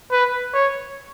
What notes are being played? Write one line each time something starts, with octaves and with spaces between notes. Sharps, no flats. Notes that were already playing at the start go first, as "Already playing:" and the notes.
B4
C#5